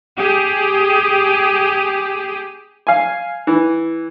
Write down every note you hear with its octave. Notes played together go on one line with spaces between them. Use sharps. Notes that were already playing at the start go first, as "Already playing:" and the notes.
G4 G#4
F5 G#5
E3